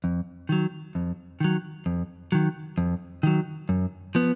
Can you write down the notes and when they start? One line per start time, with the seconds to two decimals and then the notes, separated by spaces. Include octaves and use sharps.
0.04 F2
0.49 D#3 F#3
0.95 F2
1.40 D#3 F#3
1.86 F2
2.32 D#3 F#3
2.78 F2
3.23 D#3 F#3
3.69 F#2
4.15 F3 B3